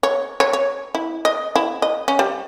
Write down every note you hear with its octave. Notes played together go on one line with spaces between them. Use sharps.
C#5
C#5
C#5
E4
D#5
E4
D#5
C#4
G3